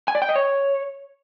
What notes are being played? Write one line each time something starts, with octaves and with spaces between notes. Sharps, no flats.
G#5
D5
G5
D#5
C#5